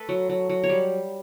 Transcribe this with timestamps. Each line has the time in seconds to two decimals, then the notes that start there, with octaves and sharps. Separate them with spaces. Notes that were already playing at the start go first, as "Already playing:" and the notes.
Already playing: A3 A4 B4
0.09 F#3
0.29 F#3
0.49 F#3
0.64 C#5
0.69 G3